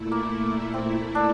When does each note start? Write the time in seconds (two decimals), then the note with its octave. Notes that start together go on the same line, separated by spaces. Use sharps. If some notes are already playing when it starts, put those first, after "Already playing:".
Already playing: A#2 A3 E4
0.11 A#3
0.74 C4
1.15 D4